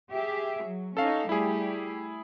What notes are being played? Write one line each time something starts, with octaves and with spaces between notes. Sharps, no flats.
G4 G#4 E5
F#3
C#4 D#4 A4 F5
G3 A3 E4 G4 G#4